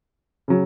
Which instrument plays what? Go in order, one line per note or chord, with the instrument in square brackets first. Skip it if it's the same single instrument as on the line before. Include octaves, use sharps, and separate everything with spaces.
[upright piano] C#3 F#3